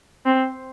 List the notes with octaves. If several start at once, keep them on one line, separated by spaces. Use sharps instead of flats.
C4